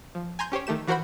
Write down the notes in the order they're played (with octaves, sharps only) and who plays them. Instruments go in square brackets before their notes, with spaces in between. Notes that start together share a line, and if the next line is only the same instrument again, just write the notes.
[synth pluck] F3
G#5 A#5 C6 G6
C#4 G4 C5 C#5
D#3 A3 G4 E7
E3 F#4 A#4 C5 F#5 B5